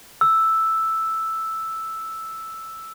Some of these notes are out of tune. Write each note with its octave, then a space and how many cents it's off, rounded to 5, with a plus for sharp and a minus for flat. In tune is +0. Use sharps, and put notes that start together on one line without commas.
E6 +0